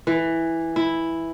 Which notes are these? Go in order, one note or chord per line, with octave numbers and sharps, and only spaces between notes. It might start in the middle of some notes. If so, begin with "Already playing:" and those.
E3
E4